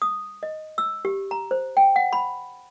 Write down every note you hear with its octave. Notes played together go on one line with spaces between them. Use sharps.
D#6
D#5
E6
G4
A#5
C5
G5
F#5
B5